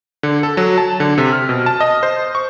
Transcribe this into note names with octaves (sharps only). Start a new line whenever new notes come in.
D3
A4
F#3
A5
D3
C3
F6
B2
A5
D#5
C5
C#6